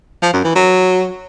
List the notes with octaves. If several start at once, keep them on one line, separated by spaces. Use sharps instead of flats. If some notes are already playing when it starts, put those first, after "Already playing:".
F3
F#2
E3
F#3